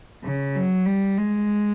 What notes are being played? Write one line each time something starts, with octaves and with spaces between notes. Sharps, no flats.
C#3
F#3
G3
G#3